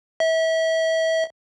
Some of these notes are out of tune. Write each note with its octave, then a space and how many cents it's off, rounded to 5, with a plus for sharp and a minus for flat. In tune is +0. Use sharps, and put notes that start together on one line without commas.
E5 -30